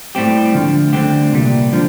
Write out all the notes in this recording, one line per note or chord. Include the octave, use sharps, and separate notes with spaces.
A2 G3 C4 G4
D2 D3 F3
D2 D3 G3 C4 G4
C2 A#2 G3
D3 F3